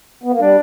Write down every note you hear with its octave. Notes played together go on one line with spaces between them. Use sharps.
B3
A#3
G3 D4